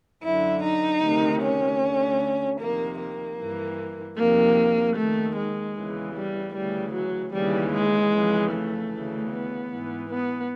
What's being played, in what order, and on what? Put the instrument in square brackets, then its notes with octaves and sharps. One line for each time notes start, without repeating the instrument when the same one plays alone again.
[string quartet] F#2 D3 E4
D#4
D2 C3 D#3
C#4
D2 D3
F2 C3 D#3 A#3
A#3
G2 E3
F2 C3 D#3 A#3
D#2 D#3 A3
G#3
E2 C#3 E3
G3
D2 C#3 E3 G3
F#3
D#2 C#3 E3 G3
G#3
F2 C#3 E3
A3
D2 C#3 E3
B3
G#2 E3
B3